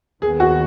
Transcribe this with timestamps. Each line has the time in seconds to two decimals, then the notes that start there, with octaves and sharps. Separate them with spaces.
0.22 D#2 D#3 B3 G#4
0.40 F#4